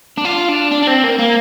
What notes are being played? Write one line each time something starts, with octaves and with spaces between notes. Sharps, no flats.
D4
F4
D4
D4
D4
C4
A#3
A#3